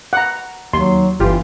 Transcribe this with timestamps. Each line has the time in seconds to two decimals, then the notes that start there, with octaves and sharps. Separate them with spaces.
0.13 F#5 A#5
0.73 D#2 F#3 C6
1.20 G1 E3 F4 G4